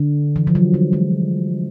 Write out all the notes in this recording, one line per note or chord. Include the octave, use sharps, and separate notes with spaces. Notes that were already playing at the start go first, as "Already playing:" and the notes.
Already playing: D3
E3
F3
F#3
G3
G#3